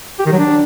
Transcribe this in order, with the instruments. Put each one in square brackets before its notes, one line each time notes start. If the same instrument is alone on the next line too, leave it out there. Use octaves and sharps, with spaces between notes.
[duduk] G4
D#3
F#3
D4